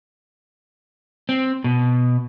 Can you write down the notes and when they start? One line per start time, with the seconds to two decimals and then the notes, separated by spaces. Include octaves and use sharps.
1.29 C4
1.64 B2